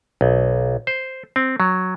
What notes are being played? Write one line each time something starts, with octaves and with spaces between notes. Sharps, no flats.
B1
C5
C4
F#3